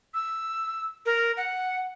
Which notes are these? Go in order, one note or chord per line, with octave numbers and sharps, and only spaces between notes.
E6
A#4
F#5